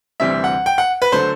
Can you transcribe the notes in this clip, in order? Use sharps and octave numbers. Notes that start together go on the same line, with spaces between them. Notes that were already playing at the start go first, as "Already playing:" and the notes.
D2 C3 E3 G3 C4 E5
F#5
G5
F#5
B4
D3 F#3 A3 C5